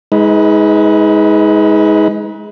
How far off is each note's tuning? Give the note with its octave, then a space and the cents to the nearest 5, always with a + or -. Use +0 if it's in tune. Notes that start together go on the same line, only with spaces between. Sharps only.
G#3 +0 D#4 +40 B4 +0